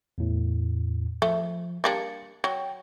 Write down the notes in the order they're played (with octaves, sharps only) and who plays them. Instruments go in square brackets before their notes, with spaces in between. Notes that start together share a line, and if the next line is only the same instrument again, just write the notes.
[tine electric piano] E2 A2
[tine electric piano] F3 [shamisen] A3
[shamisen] G3 A#3 D4 [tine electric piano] A6 C#7
[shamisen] F#3 [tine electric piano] G5